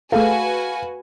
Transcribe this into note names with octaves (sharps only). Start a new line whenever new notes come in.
A3 F#4 G#4 A4 B4 F5 G#5